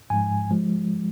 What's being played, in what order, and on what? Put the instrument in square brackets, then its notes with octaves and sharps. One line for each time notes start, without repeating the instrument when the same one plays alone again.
[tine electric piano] G#2 F3 G#3 G#5
F3 G#3